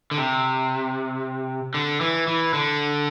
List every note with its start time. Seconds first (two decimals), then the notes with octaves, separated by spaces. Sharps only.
0.11 D3
0.18 C3
1.74 D3
2.01 E3
2.27 E3
2.54 D3